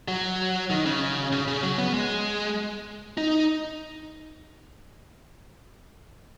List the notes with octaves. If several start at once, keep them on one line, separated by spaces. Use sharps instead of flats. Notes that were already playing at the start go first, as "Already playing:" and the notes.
F#3
D#3
C#3
C#3
C#3
F#3
B3
G#3
D#4